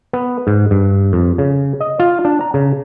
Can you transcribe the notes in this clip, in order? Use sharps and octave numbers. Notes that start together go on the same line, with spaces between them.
B3
G#2
G2
F2
C#3
D#5
F4
D4
A#5
C#3